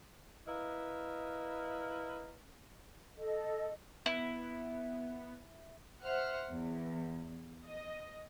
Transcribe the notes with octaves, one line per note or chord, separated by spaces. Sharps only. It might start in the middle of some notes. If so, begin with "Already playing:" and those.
E4 A#4 B4 D#5 F5
A4 D#5
B3 E4
C5 E5 F#5 F6
E2
D#5